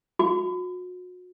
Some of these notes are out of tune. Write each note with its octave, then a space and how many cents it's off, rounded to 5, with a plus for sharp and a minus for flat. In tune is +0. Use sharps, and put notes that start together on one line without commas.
F#4 -35